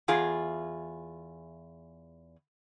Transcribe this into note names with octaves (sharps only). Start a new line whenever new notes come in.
E2 F4 G#4